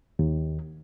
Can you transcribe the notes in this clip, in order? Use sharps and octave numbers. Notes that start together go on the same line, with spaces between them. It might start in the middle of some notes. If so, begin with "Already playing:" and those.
D#2